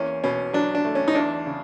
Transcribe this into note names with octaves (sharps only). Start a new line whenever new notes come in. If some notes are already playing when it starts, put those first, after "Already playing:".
Already playing: E2 A#3 C#4
B2 C#4
F#3 D4
D4
A3
C#4
D#4
E2 D4
C#3